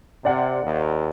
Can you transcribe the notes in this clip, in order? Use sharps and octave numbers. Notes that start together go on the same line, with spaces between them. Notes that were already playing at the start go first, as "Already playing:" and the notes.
C3 D5 F#5
D#2